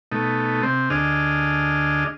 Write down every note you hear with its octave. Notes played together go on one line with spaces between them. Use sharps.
B2 A3 D#4
C3 C4
D2 D4 G#4 D#5 F6